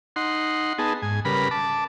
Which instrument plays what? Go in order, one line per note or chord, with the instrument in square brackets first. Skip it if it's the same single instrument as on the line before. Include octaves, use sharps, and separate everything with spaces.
[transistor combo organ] D#4 F#5 C6
B3 D#4 G#4 A5
G#2 G#5
C#3 G3 A#4 B4 B5
A5 D6